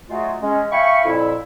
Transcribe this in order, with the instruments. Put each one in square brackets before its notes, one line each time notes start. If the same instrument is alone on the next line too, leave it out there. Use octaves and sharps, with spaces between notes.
[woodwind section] F#3 G#3 A3 F4 F#4 G#4
G#3 C#4
E5 F5 G5 G#5 B5 C#6
F2 A#2 E4